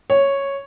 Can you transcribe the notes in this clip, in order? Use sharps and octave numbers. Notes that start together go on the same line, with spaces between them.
C#5